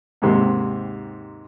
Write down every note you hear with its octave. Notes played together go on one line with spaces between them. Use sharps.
D#2 G#2 C3 D#3